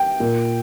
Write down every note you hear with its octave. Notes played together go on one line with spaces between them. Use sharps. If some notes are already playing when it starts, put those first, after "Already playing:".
Already playing: G5
A#2